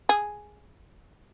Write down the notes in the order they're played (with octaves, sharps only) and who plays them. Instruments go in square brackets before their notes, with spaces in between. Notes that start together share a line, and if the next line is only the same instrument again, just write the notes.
[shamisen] G#4